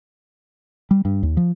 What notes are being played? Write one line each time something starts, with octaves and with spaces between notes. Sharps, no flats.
G3
G2
D#2
F3